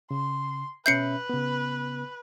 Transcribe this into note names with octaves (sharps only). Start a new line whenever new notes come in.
C#3 C6
B2 C#4 B4 E5 G6 C7 C#7
C#3 B3